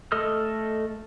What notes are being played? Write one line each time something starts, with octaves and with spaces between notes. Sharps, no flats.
A3 A4 D#5 D#6 F6